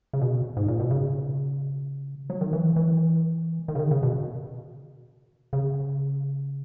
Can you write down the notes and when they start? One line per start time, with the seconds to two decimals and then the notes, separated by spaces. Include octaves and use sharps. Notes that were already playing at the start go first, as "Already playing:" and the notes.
0.13 C#3
0.22 B2
0.57 G#2
0.68 A#2
0.80 B2
0.91 C#3
2.30 F#3
2.41 D#3
2.53 E3
2.76 E3
3.68 D#3
3.75 C#3
3.79 D#3
3.91 C#3
4.03 B2
5.53 C#3